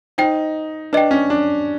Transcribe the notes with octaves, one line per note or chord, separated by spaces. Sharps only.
D#4 C5 D#5 G5
D4 B4 D#5 G5
C#4
D4